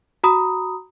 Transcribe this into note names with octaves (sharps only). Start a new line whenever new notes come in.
F#4 A#5 B5 D#6